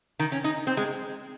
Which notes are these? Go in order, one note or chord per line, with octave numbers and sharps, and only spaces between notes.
D#3
C#4
D#4
C4
G#3